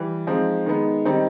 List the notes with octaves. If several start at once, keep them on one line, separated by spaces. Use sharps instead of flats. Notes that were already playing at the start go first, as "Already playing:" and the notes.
Already playing: E3 G3
F3 G#3 C4 D#4
D#3 G#3 B3 D#4
D#3 G3 C4 D#4